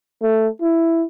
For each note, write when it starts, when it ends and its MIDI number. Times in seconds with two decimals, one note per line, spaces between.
0.22 0.48 57
0.61 1.04 64